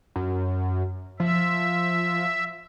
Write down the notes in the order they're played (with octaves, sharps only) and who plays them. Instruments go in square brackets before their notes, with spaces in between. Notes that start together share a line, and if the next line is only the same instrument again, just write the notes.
[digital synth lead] F#2
[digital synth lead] F3 [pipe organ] E5